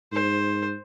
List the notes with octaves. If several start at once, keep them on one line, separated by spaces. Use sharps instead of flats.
G#2 C5